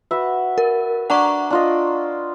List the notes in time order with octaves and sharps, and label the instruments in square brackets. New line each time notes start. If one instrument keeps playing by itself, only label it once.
[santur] F#4 B4 E5
[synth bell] A#4
[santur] D4 [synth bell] F#5 A#5 C#6
[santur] D4 F4 D#5